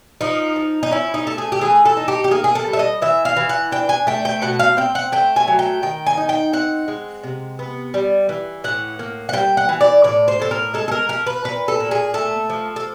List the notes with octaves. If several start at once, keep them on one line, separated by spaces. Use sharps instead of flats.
F3 D#4
F3
D#4
C#4 E4
D#4
A3 A4
G#4
G4
E3 G#4
A4
D#4
G4
G4
A#3 G#4
G#4
A4
G3
E5
D#5
E3 E5
F5
E3
F#5
D4 G5
G#5
A3 G5
G5
B2 F#5
F5
C4 G5
F#5
A3 G5
G#5
F#3
G5
D#3 G5
G#5
D#4
G5
C4 F#5
G#3
C3
B3
G3
E3
A2 F#5
A#3
F#5
G3 G5
F#5
E3
D5
A2 D5
C5
A2 A4
A#4
G#3 A4
A4
A#4
F3 A#4
B4
A#2 B4
A4
A#2
G#4
A3 A4
F3
A4